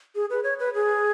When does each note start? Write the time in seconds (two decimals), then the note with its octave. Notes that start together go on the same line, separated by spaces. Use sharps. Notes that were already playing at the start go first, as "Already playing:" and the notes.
0.15 G#4
0.30 B4
0.44 C#5
0.59 B4
0.74 G#4